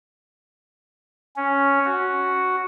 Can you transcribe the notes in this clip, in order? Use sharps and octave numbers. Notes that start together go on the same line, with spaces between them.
C#4
F#4